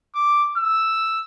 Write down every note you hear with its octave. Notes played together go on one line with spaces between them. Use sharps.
D6
E6